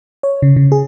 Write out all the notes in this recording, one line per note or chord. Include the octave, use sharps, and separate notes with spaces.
C#5
C#3
C#3
G#4